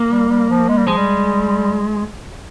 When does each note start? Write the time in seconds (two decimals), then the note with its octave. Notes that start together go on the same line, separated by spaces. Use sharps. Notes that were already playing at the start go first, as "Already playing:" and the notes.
Already playing: A#3
0.10 G3
0.29 G3
0.49 F3
0.69 G#3
0.78 G3
0.87 F3 G#3
0.97 G3